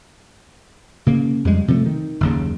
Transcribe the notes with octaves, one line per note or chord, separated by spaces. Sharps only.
C#3 A#3
F2 G3 G#3
C3 F3 F#3 A3
D#3
F#1 D#2 C#3